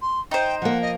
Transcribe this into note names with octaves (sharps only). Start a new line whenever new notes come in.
C6
D#4 C5 G5
F3 A#3 F#5
D#5